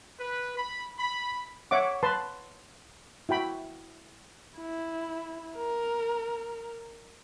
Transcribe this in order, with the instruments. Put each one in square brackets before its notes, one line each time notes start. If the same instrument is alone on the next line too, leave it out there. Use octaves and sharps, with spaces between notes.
[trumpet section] B4
B5
B5
[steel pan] C#5 E5 F#5 D6
B4 A5 C6
E4 F#4 G5 B5
[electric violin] E4
A#4